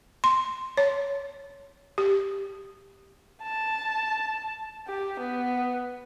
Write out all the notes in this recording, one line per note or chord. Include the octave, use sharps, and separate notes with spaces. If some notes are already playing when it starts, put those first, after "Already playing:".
C6
C#5
G4
A5
G4
B3